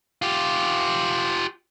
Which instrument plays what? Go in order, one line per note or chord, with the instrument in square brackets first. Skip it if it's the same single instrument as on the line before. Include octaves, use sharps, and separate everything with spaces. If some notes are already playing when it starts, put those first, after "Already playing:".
[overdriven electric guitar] F4 G4